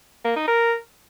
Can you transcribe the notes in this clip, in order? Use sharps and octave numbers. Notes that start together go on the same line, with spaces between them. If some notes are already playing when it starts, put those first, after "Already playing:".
A#3
D#4
A#4